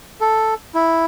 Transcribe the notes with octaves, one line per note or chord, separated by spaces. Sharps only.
A4
E4